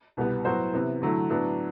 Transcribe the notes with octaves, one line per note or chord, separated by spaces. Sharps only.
C2 B2 G3 B3
A2 F#3 B3 F#4 C5
C3 E3 B3 E4
D3 F#3 A3 E4
A2 F#3 B3 D4